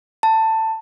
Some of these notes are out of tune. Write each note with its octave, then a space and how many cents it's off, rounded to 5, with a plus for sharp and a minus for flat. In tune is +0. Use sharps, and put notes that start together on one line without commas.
A5 +15